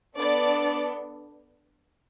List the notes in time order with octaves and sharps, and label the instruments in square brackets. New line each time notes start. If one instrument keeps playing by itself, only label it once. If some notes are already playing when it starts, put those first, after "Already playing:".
[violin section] B3 D4 A4 D5